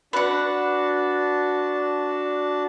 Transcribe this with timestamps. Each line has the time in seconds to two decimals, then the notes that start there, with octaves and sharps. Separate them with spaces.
0.13 D4 F#4 B4 F#5 A5